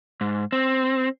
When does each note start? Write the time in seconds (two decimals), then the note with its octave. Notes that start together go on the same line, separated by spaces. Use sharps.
0.21 G#2
0.52 C4